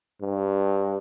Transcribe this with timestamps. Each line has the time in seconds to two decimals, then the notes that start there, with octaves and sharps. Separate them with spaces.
0.22 G2